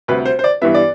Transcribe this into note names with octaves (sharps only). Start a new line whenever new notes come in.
D2 C3 G3 B4
C5
C5
D5
G2 E3 G3 B3 E5
D5